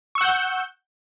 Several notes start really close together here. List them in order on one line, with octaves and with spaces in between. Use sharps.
C#6 E6 F#5 G6